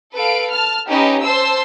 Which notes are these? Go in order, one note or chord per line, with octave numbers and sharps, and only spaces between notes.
A4 B4 F5 D7
A5 F6
C#4 D#4 G4 B4 D#5
C5 A5 C6 E6